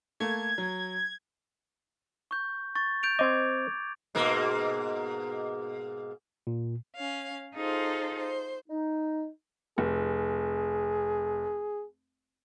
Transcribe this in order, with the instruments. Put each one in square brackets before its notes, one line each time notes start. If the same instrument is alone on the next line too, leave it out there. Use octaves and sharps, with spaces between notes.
[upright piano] A3 A#3 [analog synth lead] G#6
[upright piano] F#3
[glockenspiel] C#6 G6
C#6 A6
G6 D7 F7
[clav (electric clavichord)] C4 D#5 [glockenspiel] D6 G#6
[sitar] G#2 B2 A#3
[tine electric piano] A#2
[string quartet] C#4 F5
D#4 F4 G#4 A4 C5
C5
[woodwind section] D#4
[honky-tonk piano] F1 [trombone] G#4